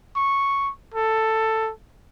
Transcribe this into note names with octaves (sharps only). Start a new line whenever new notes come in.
C#6
A4